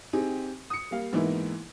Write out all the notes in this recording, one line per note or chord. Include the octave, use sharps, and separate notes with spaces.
C4 D#4 G4 G#4
D#6 C#7
G3 A#3 F5
G#2 E3 A#3 B3 D#4 E4